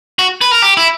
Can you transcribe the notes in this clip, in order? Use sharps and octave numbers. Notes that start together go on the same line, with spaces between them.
F#4
B4
A#4
G4
E4